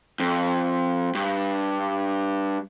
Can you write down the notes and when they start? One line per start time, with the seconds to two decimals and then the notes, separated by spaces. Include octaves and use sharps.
0.20 F2
1.15 G2